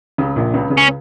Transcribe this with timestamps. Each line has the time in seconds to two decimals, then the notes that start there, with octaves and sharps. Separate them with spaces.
0.18 C#2 C#3
0.36 A#1 A#2
0.54 C#2 C#3
0.70 C#2 C#3
0.78 C#4